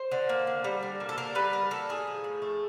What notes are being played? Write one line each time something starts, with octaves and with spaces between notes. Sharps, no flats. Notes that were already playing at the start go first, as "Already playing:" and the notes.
Already playing: C5
D3
A#3
D3
G3
D3
A#3
A4
D3 A#4
G3 B4
D3 A#4
A#3 A4
A2 G#4
F3
A2
A3